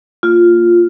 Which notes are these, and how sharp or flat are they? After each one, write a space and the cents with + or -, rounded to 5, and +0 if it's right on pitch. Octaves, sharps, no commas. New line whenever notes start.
A#3 -15 F4 +0